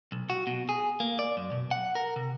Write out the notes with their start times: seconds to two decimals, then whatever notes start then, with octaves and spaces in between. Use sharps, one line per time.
0.12 B1
0.30 F#4
0.47 B2
0.69 G#4
1.00 A#3
1.19 D5
1.37 F#2
1.52 B2
1.71 F#5
1.95 A#4
2.16 C3